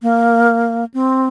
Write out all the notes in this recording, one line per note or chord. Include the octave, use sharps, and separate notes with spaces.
A#3
C4